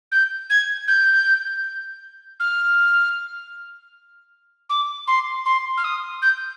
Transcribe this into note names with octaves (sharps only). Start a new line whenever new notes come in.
G6
G#6
G6
F6
D6
C6
C6
F6
D#6
G6